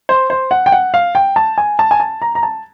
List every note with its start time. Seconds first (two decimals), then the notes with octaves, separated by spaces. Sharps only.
0.09 C5
0.30 C5
0.51 F#5
0.66 G5
0.72 F#5
0.94 F5
1.15 G5
1.36 A5
1.58 G#5
1.79 A5
1.91 G#5
2.00 A5
2.22 A#5
2.35 A#5
2.43 A5